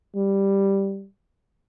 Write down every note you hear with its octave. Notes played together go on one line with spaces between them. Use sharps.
G3